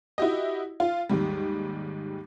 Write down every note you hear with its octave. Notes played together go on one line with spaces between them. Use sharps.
E4 F#4 G4 D#5
F4
D#2 G#2 G3